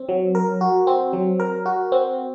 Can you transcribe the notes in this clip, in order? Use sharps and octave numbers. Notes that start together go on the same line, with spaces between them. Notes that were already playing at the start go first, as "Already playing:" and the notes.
Already playing: C4
F#3
A#4
F#4
C4
F#3
A#4
F#4
C4